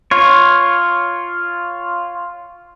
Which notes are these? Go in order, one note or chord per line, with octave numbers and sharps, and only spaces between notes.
F4 C#5